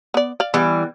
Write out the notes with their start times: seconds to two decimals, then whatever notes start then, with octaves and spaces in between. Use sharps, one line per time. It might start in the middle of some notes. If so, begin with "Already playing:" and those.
0.14 B3 D5
0.40 D5 F5
0.54 E3 G3 B3